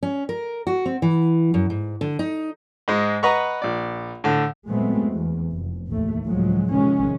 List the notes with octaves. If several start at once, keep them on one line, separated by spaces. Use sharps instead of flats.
C#4
A#4
F#4
C4
E3
F#2
G#2
D3
D#4
G#2 G#3
B4 D#5 F#5 A#5 B5 C#6
A#1 D5
A2 D3
A#2 F#3 G#3 A3 B3 C4
E2
F1
A1 D#2 A3
C#2 A2 F3 F#3 G#3
C3 D#3 F3 G#3 C#4